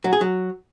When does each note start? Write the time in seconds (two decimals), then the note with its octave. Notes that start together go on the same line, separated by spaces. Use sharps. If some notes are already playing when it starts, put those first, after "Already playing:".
0.04 F#3
0.13 G#4
0.21 F#3